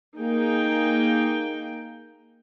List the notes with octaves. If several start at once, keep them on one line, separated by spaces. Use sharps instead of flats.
A#3 D#4 G#4 G5